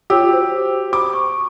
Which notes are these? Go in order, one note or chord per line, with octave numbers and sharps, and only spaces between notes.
F4 G4 C#5 E6
F#4 C5
B5 D6
C#6